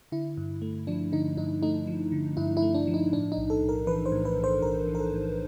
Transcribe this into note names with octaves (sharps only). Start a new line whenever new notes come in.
D3 E4
G2
A3
F3 D4
D3 D#4
G2 D#4
A3 D#4
F3
D3
G2 E4
E4
A3
D4
F3
D#4
A2 D4
D#4
B1
A4
B1
A#4
E3 B4
C5
A2
B4
B1
C5
B1 A#4
E3
A#4
A4
A2